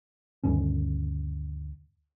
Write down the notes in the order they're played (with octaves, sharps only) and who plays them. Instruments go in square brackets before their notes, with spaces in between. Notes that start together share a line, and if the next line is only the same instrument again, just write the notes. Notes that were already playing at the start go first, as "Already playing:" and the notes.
[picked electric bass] D2 G2 D#3 C#4